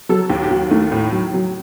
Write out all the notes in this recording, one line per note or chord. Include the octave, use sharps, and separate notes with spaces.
F#3 A4
D#2 G4
G4
D#2 F#4
D#3 A3
A2
F#3
F#3